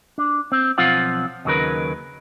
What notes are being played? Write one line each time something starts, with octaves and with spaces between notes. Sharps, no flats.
D4
C4
B1 F3 C4 F4 F5 F#5
D#2 C#3 F#3 D#4 A#4 B4